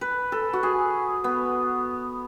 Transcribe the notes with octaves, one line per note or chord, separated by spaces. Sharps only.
B4
A4
F#4
G#4
B3